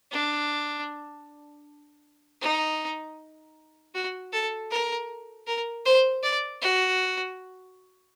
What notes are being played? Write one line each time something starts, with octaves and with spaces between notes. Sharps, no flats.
D4
D#4
F#4
A4
A#4
A#4
C5
D5
F#4